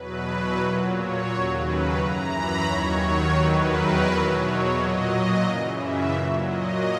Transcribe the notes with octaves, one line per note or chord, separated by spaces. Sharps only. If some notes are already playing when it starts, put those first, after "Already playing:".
Already playing: E2 B2 F#3 B4
B4
A#2 F#3
C#5
D#2 C#3 F#3 C#5
B4
F#2 E3 A#5
B5
D#2 D#3 F#3 C#5
C#5
E2 D#3 F#3 B4
A#4
E2 B2 F#3 B4
C#5
A#2 F#3 D#5
D#5
F#2 C#3 E3
E5
A#2 F#3
D#5